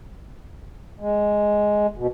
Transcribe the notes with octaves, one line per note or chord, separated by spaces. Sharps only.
G#3
B2